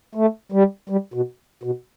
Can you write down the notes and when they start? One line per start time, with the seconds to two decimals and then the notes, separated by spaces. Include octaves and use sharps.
0.15 A3
0.52 G3
0.89 G3
1.14 B2
1.63 B2